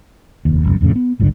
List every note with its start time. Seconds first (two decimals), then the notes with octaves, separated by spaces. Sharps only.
0.45 F1 D#2
0.64 E1 C#2 F#2
0.81 E1 F2 A2 C#3
0.96 B3
1.20 G#1 C#2 G2 D3